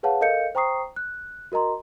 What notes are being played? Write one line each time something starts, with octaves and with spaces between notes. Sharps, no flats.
G#4 B4 C#5 F5 F#5 A5
A4 A#4 D#5 F5 G6 C#7
C5 G5 A#5 C#6 D#6 C7
F#6
F#4 A#4 D#5 A#5 C6